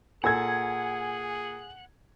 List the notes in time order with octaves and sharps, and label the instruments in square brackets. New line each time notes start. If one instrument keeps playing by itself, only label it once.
[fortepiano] A#2 A4 E6 [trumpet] G#4 [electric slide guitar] F#5 [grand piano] G#5 G#6